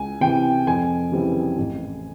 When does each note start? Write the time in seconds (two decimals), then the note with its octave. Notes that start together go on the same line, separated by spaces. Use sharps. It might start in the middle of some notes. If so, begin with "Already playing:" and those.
Already playing: C#2 G#5
0.21 C3 E3 G5
0.67 F2 G#5
1.12 C#3 E3 G3 C4
1.58 A1